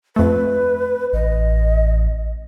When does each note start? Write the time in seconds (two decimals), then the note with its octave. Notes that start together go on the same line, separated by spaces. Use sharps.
0.16 F2 A3 B4
1.13 A1 D#5